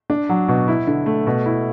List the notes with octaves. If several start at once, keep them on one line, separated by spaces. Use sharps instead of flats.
D4
F#3
B2
E4
D3
A3
B2
E4